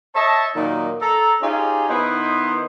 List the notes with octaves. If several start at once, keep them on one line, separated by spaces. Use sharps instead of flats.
C#5 D#5 E5 A5
A#2 D#3 F#3 D#4
A4 A#5
C#4 D#4 F4 G4 G#4
D#3 B3 D#4 E4 B4 C5